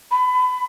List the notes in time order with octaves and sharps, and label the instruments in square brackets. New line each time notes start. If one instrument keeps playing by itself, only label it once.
[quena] B5